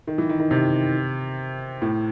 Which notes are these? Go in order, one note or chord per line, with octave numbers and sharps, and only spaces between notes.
D#3
E3
D#3
D#3
C3
A2